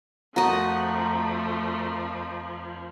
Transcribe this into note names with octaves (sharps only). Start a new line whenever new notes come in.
F2 F3 A3 F#4 A#4 D#5